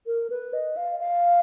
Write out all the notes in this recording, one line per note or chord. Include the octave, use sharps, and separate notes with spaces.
A#4
B4
D#5
F5
F5